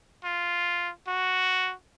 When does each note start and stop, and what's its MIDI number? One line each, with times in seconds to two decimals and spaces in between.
0.24 0.91 65
1.08 1.73 66